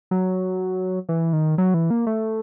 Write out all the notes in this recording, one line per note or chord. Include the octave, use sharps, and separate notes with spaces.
F#3
E3
D#3
F#3
E3
A#3
A3